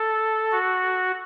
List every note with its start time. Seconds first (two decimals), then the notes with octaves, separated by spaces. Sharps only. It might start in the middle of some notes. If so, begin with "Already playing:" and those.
Already playing: A4
0.52 F#4